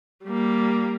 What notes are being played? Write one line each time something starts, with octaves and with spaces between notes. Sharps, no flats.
G3 A#3